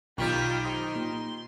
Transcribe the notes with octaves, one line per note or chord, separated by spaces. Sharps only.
B1 D#3 D#4 F4 G4 B5 G#6
G4 C5 D#5 C6
A#2